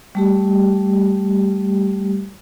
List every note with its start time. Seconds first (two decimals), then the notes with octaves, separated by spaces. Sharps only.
0.15 G3 A3 G4